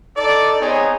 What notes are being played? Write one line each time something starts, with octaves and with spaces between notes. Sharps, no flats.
D#4 A4 D5
B3 C4 D#4 G#4 C#5